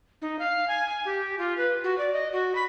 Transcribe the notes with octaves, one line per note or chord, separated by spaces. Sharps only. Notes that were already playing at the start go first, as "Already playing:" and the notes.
D#4
F5
G#5
G#5
G4
F4
B4
F#4
D5
D#5
F#4
B5